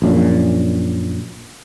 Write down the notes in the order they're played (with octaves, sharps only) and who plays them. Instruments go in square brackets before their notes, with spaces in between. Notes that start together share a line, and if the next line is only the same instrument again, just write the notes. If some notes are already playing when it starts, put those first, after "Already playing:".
[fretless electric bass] A#1 F#2 A#2